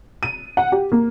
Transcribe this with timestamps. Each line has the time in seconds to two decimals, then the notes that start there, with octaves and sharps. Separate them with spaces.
0.23 D#7
0.57 F#5
0.72 G4
0.92 A#3